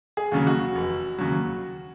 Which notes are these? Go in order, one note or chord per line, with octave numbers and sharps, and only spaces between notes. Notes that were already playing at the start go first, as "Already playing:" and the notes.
G#4
D#2 C#3 F#3
F#4
F1
D#2 C#3 F#3